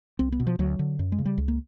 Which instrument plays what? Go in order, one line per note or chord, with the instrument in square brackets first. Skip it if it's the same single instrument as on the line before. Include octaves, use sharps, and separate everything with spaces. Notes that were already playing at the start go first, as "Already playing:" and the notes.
[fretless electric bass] C2 C4
B3
B2
F3
D2 F#3
D3
F#2
G#3
C#3
G3
C#2
A#3